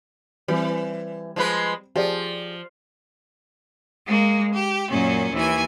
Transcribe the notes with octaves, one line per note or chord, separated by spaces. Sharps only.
E3 G3 C4
F3 G#3 B4
F3 G4 G#4 D5
G#3 A#3
G4
F#2 A#2 C#4
D#2 E3 G#5